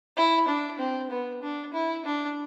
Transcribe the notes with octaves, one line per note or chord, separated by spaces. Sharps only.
E4
D4
C4
B3
D4
E4
D4